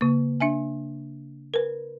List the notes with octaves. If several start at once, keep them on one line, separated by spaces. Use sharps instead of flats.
C#3 A#3
D4 E5 G#5
A#4 B4